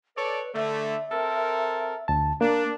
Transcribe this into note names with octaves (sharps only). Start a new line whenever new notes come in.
A4 B4 C#5 D5
D3 A3 E5
C4 A4 A#4
D2 A5
A#3 D4 A#4